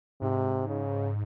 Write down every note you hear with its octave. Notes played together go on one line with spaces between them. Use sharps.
G#2 C3
C#3